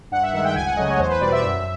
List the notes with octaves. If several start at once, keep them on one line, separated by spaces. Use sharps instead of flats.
G2 F#5
E5
D#3 G#3 F#5
G5
C#2 G#5
F#5
C#3 F#3 A3 D#5
C#5
E2 C5
B4
B2 G3 D5
E5
F#2